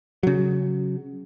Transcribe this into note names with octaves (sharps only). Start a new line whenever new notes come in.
C#3 F#3